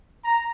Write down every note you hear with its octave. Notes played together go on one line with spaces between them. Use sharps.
A#5